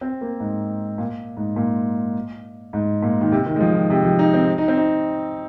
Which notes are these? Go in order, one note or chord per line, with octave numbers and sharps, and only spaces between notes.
C4
A#3
G#2
A#2
G#2
A#2
G#2
A#2
D#3
C3
D#3
G#3
F3
D#3
C3
F3
D#4
C4
D#4
C4
D#4